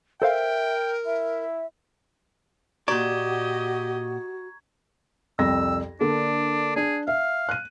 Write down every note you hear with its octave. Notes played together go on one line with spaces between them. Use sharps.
A4 A#4 C5 E5 F5 G5
E4 E5
A#2 F#4 G4 D5 D#5 A#5 C#6 G#6
C2 F2 E6 A#6
D3 A#3 D4 A4
D4 G#4
E5 F5
F#6 D#7